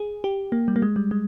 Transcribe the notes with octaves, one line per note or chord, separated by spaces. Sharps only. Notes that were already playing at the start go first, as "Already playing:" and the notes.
Already playing: G#4
G4
A#3
G3
A#3
G#3
G3
G#3